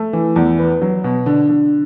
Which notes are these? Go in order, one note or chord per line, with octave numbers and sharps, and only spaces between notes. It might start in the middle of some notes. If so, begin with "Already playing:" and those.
Already playing: A3
E3
E2
B3
F#3
B2
D3
D3